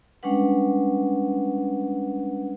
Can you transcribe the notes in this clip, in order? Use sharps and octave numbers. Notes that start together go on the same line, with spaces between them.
G3 G#3 C#4 D4 B4 F#5